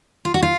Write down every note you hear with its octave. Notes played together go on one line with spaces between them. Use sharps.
F4
F#4
F4